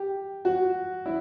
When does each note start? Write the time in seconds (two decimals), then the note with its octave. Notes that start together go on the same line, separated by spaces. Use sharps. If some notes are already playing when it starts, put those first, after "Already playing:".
Already playing: G4
0.45 F#4
1.06 E4